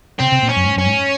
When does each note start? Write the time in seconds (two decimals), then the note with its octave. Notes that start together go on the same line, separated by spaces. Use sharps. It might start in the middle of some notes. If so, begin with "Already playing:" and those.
0.20 C3 C4
0.32 C3
0.42 A#2
0.49 C#4
0.56 F#2
0.64 G#2
0.76 F#2 C#4
0.86 G#2